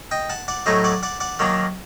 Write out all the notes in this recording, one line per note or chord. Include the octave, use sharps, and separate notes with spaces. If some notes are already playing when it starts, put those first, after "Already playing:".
D#5 G5
F#5 A5
D5 F#5
A2 F#3 A3 D#4 C5 D#5
D5 F#5
D5 F#5
D5 F#5
D#3 F#3 A#3 D4